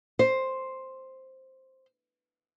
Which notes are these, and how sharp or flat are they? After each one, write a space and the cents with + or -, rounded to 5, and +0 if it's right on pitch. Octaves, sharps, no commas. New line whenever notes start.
C5 +5